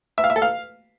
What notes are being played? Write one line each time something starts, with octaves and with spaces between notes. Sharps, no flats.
E5
F5
E5
A4
F5